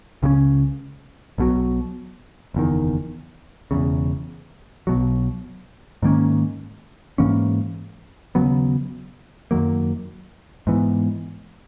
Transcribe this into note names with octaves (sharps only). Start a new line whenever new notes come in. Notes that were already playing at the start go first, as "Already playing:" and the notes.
C#2 C#3 F#3 C#4
B1 B2 F#3
F#1 E2 D#3
E1 E2 C#3
B1 B2 F#3
G#2 D#3 A#3 C#4
G#2 E3 A#3 C#4
D#2 C#3 F#3 B3
F#2 D#3 F#3 A#3
G#2 E3 B3